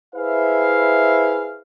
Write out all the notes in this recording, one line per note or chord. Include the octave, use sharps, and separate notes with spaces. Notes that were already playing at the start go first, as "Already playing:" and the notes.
E4 G#4 B4 C5 E5 F5